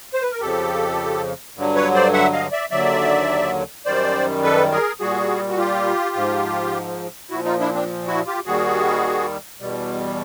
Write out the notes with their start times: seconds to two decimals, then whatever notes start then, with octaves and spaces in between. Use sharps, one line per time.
0.14 C5
0.22 B4
0.31 A#4
0.41 F2 C#3 F3 G4 A4
1.56 G2 D3 F#3
1.75 B4 C#5
1.95 C5 D5
2.13 E5 F#5
2.33 D#5 F5
2.52 D5 E5
2.71 D#2 D3 F#3 D5 E5
3.86 F#2 D#3 G3 C5 D5
4.43 A4 B4
4.72 G#4 A#4
5.00 A#2 G3 F#4 G#4
5.49 F#4
5.58 F4 G4
6.16 G#2 F3
7.30 A#2 F3 E4 F#4
7.45 D#4 F4
7.60 D4 E4
7.74 C4 D4
8.07 E4 F#4
8.26 F4 G4
8.45 D#2 D#3 G3 F#4 G#4
9.60 E2 B2 G3